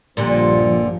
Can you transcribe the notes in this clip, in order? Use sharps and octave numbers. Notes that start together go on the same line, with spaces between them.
A#1 G2 A#2 D3 F3 G3